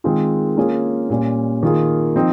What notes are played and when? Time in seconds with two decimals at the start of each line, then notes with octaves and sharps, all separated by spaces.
0.04 D#3 G#3 C4 F4 G#4
0.57 A#3 C#4 F4 G#4
1.10 A#2 G3 C#4
1.63 D#3 A#3 F4 G#4
2.16 F3 C4 D#4